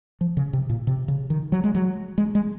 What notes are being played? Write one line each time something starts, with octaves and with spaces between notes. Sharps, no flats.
F3
C#3
C3
A#2
C3
C#3
D#3
F#3
G#3
F#3
G#3
G#3